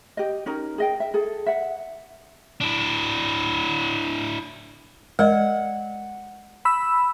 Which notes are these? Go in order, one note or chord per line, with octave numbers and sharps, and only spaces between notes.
G4 D#5
C#4 D#4 A#4
G#4 D#5 G5
E5
G#4 A4
E5 F#5
D4 E4
G#3 A#4 D5 D#5 F#5
B5 E6